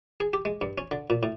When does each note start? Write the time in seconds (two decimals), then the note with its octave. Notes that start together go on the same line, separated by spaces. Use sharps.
0.20 G#4
0.33 G4
0.45 G#3
0.61 G2
0.78 C#4
0.91 D3
1.10 A#2
1.23 A2